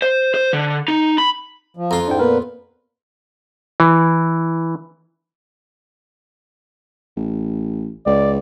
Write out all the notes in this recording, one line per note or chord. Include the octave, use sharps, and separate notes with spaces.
C5
C5
D3
D#4
B5
F3
F2 F4 A#5 C6
G#2 D4 E4 G5
A#2 A#3 B3 A#4 B4
E3
A1
C#2 D5